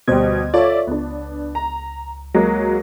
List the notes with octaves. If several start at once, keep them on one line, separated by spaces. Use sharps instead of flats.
D2 B2 G3 C5 G#6
F4 A4 C#5 D5 E5
C#2 B3 D4
A#5
F#3 G#3 A#3